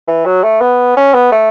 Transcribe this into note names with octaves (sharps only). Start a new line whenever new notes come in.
E3
F#3
A3
B3
C#4
B3
A3